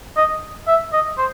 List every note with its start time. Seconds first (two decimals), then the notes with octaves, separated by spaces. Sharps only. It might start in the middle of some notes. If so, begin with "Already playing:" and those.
0.17 D#5
0.67 E5
0.93 D#5
1.18 C5